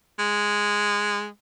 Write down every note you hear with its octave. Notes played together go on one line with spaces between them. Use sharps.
G#3